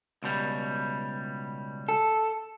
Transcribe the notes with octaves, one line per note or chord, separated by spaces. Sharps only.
C#2 B2 G3
A4